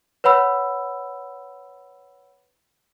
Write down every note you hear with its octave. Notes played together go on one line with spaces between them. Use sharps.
B4 C#5 F#5 B5 E6